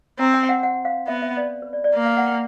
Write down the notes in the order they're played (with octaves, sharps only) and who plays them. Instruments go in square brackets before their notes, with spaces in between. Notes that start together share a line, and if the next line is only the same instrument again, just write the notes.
[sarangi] C4 [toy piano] A#5
[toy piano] G#5
G5
F#5
F#5
F5
[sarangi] B3 [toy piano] E5
[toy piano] E5
D5
B4
D5
D5
[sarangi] A#3
[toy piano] F5
F#5
G5